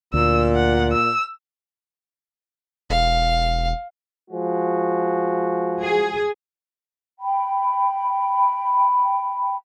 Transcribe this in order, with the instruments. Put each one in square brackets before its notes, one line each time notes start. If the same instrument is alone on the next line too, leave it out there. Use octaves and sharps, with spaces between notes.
[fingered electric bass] D2 [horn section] A#2 [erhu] E6
[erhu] F#5
E6
[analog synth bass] E1 [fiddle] F5
[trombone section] F3 G#3 F#4
[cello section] G#4
[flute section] G5 B5